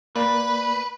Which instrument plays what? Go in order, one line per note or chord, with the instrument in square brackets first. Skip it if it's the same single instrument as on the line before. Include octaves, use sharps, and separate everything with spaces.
[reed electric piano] A#3 D5 [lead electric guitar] B4